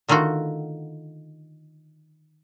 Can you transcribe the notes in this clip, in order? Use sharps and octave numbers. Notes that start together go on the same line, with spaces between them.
D3 D#3 A3 F4 F#4